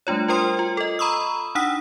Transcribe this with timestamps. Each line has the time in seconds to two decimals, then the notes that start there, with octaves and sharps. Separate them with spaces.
0.07 G3 A3 D4 F4 C#5
0.28 F4 A#4 C5 G5 C6 D#6
0.59 F4
0.77 A4 D#5
0.99 A#5 B5 C#6 D#6 E6
1.55 D4 D#4 F#5 D#6 E6 B6